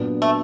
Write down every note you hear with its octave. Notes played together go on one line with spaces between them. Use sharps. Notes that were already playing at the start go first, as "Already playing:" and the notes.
Already playing: A#2 F#3 B3 D4
A3